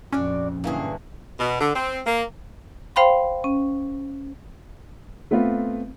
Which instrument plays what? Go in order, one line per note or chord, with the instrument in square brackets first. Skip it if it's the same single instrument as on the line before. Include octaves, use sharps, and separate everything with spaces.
[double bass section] A#1 F2 [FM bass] C#4 [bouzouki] D4 F#4 D5
[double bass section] G2 [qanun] D3 E3 A#3 [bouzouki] F#3 G#4
[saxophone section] B2
D3
C4
A#3
[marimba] C5 F5 G5 B5 C6
C#4
[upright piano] A3 B3 C4 F4